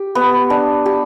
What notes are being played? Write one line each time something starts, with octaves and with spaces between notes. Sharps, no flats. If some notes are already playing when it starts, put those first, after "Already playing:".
Already playing: G4
B3
D4
G4